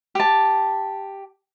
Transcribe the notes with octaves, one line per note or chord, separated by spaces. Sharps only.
G4 A5